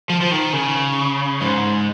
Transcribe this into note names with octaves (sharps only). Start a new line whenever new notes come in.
F3
F3
D#3
C#3
G#2